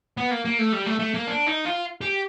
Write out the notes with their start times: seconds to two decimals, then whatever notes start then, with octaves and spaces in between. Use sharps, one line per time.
0.17 B3
0.31 A#3
0.45 A#3
0.59 A3
0.73 G3
0.86 A3
0.99 A3
1.14 A#3
1.27 D4
1.47 D#4
1.65 F4
2.01 G4